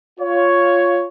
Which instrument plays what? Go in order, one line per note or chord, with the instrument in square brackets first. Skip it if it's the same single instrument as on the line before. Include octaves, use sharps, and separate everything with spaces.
[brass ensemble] F4 C#5